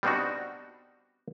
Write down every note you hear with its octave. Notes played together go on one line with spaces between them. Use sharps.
G3 B3 C4 D4 D#4 F#4